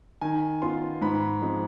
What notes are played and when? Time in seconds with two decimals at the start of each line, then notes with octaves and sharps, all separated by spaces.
0.21 D#3 G#5
0.62 B3 F4 C6
1.01 G#2 B5
1.42 F3 G#3 C4